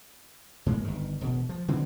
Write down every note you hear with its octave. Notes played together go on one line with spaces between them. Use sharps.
G#2 G#3 A#3
G1 D#3
E1 B2
F3
D3 E3 G#3 C4